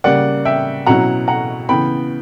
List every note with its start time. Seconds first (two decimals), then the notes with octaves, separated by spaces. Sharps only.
0.04 C#3 G3 A#3 D5 F#5
0.45 E5 G5
0.86 B2 F#3 C#4 E4 F#5 A#5
1.28 F#5 A#5
1.69 C#3 E3 B3 G5 B5